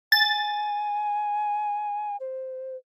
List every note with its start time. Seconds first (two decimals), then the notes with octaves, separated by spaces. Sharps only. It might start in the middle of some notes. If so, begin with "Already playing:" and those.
0.12 G#5 A6
2.20 C5